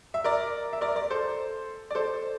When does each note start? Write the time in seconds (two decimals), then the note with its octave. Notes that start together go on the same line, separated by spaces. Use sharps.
0.14 E5
0.24 A#4 D5
0.73 E5
0.81 A#4 D5
0.95 A#4 D5
1.10 A4 C5
1.91 D5
1.95 A4 C5